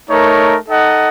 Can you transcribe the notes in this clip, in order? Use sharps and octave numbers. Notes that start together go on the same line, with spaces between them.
A3 D#4 A#4 C#5
D#4 A4 D#5 F#5